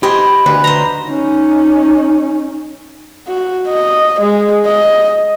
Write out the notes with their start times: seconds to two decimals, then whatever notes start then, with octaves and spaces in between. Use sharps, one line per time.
0.03 G4 C5 D#5 G#5 B5
0.46 D2 B4
0.64 C5 A#5
1.08 C#4 D#4
3.27 F#4
3.68 D#5
4.21 G#3
4.67 D#5